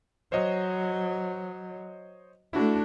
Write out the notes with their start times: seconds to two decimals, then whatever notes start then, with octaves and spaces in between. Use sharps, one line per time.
0.32 F#3 C5 C#5 D#5
2.53 A3 D4 E4 F#4